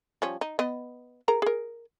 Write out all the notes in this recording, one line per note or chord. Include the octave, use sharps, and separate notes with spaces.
F3 G3 C#4
D#4
B3 D#5
G#4 A#4 A#5
G#4 A#4